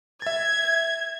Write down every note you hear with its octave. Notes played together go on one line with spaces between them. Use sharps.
E5 G#6 A6